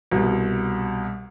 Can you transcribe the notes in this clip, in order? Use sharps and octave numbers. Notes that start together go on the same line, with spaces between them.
C2 B2